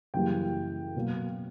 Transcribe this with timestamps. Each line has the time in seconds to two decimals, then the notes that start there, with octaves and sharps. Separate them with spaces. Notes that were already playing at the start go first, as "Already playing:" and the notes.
0.14 F#2 C#3 E3 G3 A#3 G5
0.96 B2 F#3 A#3